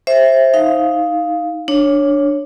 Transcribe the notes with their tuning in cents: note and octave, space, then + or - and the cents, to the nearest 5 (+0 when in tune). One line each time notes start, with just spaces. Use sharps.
C5 +20 E5 +0
D#4 +10 F5 +0
D4 +0 C#5 +0